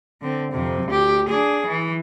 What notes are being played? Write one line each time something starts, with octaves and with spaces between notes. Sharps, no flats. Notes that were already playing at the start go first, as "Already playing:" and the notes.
D3 C4
F2 C3
D2 G4
D4 G#4
E3